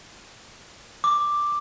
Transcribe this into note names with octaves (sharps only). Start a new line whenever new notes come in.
D6